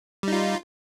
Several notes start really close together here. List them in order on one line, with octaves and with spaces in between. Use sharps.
G3 D#4 F4